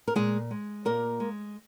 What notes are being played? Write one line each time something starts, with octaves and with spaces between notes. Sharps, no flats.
A#4
A#2 G#3 G#4
G#3
A#2 A#3 A#4
G#3